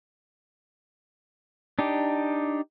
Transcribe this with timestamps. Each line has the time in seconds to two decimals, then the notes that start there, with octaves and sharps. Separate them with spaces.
1.79 D4 D#4 G4